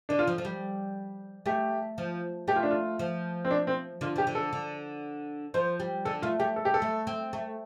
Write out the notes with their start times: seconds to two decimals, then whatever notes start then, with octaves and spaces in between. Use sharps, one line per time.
0.09 D3 D4
0.19 F4
0.27 F3
0.38 F3
0.45 G3
1.46 A3 G4
1.98 F3
2.48 A3 G4
2.56 F4
2.63 D4
2.71 F4
2.99 F3
3.45 C4
3.51 D4
3.67 C4
4.01 D3 F4
4.16 F3 G4
4.27 D3
4.35 A4
4.53 D3
5.54 F3 C5
5.80 G3
6.05 D3 A4
6.22 A3 F4
6.39 A3 G4
6.56 A4
6.65 G4
6.74 A4
6.82 A3
7.07 C4
7.33 A3